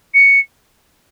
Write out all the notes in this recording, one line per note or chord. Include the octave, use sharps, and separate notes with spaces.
C#7